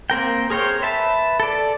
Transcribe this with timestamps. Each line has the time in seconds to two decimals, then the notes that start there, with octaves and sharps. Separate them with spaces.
0.10 A#3 C4 A#4 G5
0.50 G#4 A#4 C5 C#5 G5
0.82 B4 E5 A5
1.40 A4 D5